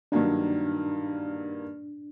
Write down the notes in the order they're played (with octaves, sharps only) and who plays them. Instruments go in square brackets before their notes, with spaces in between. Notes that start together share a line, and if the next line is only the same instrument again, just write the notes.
[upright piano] G2 D#3 F#3 A#3 D#4 [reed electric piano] D4